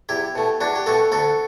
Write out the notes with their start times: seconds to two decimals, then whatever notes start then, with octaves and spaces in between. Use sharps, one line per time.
0.09 E2 E4 G4
0.35 B2 A3
0.61 E2 D4 F#4
0.75 G4
0.86 B2 A3 F#4 A4
1.12 D2 F#4 A4